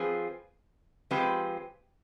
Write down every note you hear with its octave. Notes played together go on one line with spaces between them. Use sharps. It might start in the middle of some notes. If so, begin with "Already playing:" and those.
Already playing: F3 C4 F4 G#4 B4
F3 G#3 C4 G4 B4